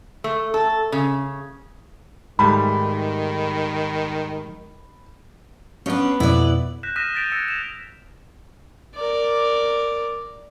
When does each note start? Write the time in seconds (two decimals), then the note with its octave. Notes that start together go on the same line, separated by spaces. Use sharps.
0.24 A3
0.54 A4
0.92 C#3
2.39 G#2 D#3 G3 A3 B5
5.86 B3 C#4 D4
6.20 F2 B2 E4 D5
6.83 F#6 G6 A#6 B6 E7
6.96 D#6 F6 A#6 B6 D#7 E7
7.15 G6 A6 B6 D7 D#7 F7
7.32 E6 F#6 G#6 A#6 C#7
7.48 E7 F7
8.95 A#4 D5